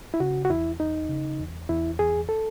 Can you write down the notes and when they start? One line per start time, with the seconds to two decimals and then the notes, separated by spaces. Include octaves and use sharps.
0.14 E4
0.20 C#3 F#4
0.45 F#4
0.49 E2 E4
0.79 E2 D#4
1.09 C#3
1.39 E2
1.69 E2 E4
1.99 E2 G#4
2.29 A4